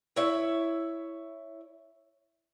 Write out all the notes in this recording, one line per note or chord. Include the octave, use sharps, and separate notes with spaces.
E4 C#5 E5